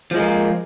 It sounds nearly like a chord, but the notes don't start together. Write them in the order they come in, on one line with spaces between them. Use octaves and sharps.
F3 G#3 A#3